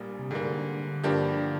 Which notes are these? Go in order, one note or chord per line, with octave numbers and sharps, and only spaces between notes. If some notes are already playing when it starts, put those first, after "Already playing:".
Already playing: A#1 A#2 G3 A#3
C3
G#2 D3 G3 A#3
G2 F3 A#3 D4 G4